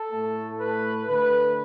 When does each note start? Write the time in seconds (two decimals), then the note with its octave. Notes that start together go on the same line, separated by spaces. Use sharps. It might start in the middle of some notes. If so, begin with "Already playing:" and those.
Already playing: A4
0.11 A2 A3
0.59 B4
1.08 D3 A3 B4